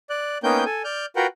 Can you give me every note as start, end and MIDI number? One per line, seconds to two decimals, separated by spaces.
0.10 0.38 74
0.10 0.38 90
0.44 0.64 58
0.44 0.64 59
0.44 0.64 61
0.44 0.64 63
0.44 0.64 79
0.44 0.64 91
0.65 0.83 69
0.65 0.83 80
0.84 1.06 74
0.84 1.06 89
0.84 1.06 91
1.16 1.27 65
1.16 1.27 66
1.16 1.27 70
1.16 1.27 71
1.16 1.27 78
1.16 1.27 79